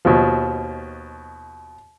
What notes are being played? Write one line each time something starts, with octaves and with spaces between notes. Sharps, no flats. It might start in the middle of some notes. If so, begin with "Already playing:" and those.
D#2 B2 F3